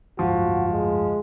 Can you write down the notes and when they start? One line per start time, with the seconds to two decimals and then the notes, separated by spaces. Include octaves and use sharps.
0.19 F#1 D2 G#2 F3 F#4
0.70 G#3